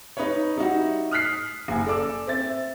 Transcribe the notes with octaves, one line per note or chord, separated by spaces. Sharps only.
D#4 B4 C#5
G3 D#4 E4 F#4
D#6 F6 F#6 B6 C7
F#1 G#5
A4 D5 D6 E6
C4 E5 A6